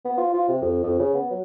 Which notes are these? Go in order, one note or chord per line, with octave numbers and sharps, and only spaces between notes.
B3
F4
F4
C3
F2
F2
C#3
B3
F#3